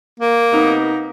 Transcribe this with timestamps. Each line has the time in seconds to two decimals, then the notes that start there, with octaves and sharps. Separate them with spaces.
0.20 A#3
0.52 C3 B3 D#4